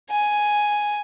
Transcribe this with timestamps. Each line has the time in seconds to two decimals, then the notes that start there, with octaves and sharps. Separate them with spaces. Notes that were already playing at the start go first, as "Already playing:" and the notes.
0.10 G#5